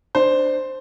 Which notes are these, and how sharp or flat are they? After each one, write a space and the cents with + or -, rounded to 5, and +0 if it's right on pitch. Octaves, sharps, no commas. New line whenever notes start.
D4 +15 C5 +0